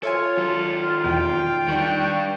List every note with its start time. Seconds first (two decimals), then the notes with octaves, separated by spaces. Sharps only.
0.03 F4 A4 C#5 E5 G#5
0.37 D#2 F#3 A4
1.04 E2 B2 G5
1.68 D#2 G3 D4 D#4 F#5 A5 C#6